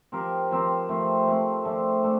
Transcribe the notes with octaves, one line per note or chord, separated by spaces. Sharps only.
F3 C4 G4 A#4
F3 C4 G4 A#4
F3 A3 C4
F3 A3 C4
F3 A3 D4 A4
A3 D4 A4